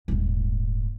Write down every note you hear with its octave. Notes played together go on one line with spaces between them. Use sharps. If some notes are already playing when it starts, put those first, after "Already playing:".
D#1 G#2